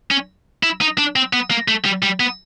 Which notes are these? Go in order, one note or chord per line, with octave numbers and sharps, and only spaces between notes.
C#4
E4
D#4
D4
C4
B3
A#3
A3
G3
G3
B3